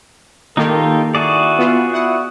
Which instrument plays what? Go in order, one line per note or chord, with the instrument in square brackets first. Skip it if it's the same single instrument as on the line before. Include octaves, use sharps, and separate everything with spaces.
[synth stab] D#3 A#3 [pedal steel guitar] D#4 F4 G4 [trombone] A4
[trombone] E4 [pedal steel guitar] F#4 G#4 D5
[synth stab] B3 F4
[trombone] E4 [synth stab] F#5